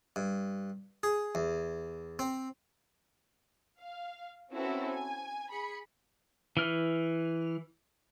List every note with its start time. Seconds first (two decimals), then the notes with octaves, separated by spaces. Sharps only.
0.16 G2
1.03 G#4
1.35 E2
2.19 C4
3.78 F5
4.51 C4 C#4 E4 F#4 A4 B4
4.88 G#5
5.49 G#4 B5 C#7
6.57 E3 F6